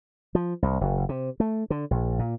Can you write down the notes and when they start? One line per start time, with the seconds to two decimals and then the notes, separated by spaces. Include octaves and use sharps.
0.35 F3
0.62 C2
0.81 F#1
1.09 C3
1.40 A3
1.70 D3
1.91 A#1
2.19 A#2